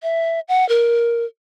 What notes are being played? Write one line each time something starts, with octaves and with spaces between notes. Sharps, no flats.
E5
F#5
A#4